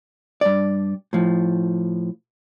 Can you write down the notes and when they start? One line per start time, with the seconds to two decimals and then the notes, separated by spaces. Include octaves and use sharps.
0.41 G2 D5
1.13 A2 F3